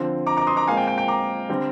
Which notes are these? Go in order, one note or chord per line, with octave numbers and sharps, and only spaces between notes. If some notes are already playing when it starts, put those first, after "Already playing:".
Already playing: D3 F3 C4
A#5 D6
A#5 D6
C6 D#6
A#5 D6
A#2 G#3 C4 F5 G#5
G5
G5
G5
A#5 D6
D3 G3 C4